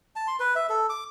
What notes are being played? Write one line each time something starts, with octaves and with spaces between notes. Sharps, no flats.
A5
C6
B4
E5
A4
D6